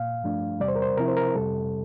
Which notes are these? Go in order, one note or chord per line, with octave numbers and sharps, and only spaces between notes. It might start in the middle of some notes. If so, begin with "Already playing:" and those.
Already playing: A#2 F5
G2 F3 A3 D4
E2 C3 G3 D5
C5
A#4
C5
C3 F3 C4 E4 A#4
C5
A#4
F2 C3 G3 A4